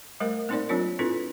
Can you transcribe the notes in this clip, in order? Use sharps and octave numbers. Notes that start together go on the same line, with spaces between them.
G3 A3 A#4 C5
A#3 C4 D#4 A#4 C5 D5
F#3 C4 D4 F4 C#5
C4 D4 E4 F4 A4 B4